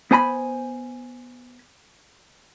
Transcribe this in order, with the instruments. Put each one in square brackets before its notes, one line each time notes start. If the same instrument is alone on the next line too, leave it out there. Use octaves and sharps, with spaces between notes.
[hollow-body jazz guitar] B3 C5 G#5 A#5 B5